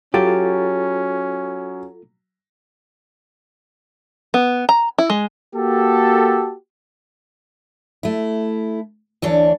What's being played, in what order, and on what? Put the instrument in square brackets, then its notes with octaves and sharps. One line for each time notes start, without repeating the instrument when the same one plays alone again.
[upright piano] F#3 [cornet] C#4 [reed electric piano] F4 A4 A6 [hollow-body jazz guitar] G4
[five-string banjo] B3
A#5
E4
G#3
[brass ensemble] A#3 F#4 G4 A4
[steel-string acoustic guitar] A3 E4
D2 E3 D4 C#5